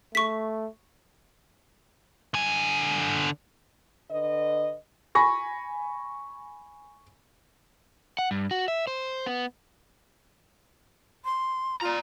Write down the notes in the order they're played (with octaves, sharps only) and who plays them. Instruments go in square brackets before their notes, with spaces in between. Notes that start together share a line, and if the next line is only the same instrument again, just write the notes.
[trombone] A3 [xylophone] C#6 B6
[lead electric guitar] D3 G#5
[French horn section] D3 B4 D#5
[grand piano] G#5 B5 C#6 A#6
[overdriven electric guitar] F#5
G2
F#4
E5
C5
B3
[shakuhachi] C6
[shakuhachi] F4 [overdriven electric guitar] D5 A#5